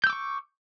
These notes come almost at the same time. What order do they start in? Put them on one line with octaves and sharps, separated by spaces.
G6 E6 D6 C#6